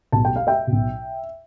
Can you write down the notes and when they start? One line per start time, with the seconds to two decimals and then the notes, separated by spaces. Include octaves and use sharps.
0.12 B1 B2 A5
0.25 G5
0.36 F5
0.47 E5 G5
0.67 B1 B2